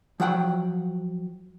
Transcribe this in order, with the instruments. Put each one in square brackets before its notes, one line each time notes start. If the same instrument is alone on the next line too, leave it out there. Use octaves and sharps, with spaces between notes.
[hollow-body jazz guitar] F3 F#3 F#5 G5